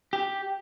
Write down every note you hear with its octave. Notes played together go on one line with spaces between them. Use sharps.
G4